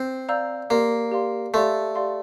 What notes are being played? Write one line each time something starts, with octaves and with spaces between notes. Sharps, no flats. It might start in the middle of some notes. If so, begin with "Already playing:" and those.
Already playing: C4
D5 F5 A#5 E6 G6
A#3 G4 D5 F5 C6
G4 D5 F5 C6
A3 G4 D5 F5 C6
G4 D5 F5 C6